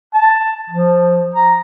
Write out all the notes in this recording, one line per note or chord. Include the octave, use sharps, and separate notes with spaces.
A5
F3
A#5